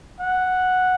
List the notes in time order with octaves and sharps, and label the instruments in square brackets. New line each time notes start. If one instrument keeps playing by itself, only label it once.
[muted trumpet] F#5